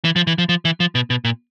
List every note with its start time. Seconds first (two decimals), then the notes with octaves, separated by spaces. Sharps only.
0.05 E3
0.16 F3
0.27 E3
0.38 F3
0.49 F3
0.65 E3
0.80 F3
0.95 B2
1.10 B2
1.25 A#2